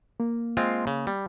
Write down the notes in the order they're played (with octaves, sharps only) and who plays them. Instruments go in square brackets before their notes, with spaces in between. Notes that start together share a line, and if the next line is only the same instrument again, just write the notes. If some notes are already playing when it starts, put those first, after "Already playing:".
[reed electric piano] A#3
[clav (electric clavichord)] G#3 C4 F4
C#3
G3